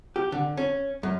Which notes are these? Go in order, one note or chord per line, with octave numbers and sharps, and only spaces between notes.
G4
D3
C#4
F#2